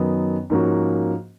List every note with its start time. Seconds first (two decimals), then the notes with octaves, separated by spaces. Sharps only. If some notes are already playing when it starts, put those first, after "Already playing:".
Already playing: F#2 D#3 F#3 B3 D#4
0.50 G#2 F3 A#3 C#4 F#4